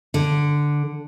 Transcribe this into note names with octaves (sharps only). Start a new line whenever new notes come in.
D3